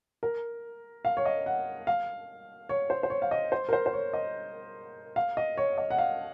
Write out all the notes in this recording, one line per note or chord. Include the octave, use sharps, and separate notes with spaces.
A#4
F5
C#5
D#5
F#5
F5
C#5
C5
C5
C#5
F5
D#5
C5
A#4
C5
C5
C#5
D#5
F5
D#5
C#5
D#5
F#5
F5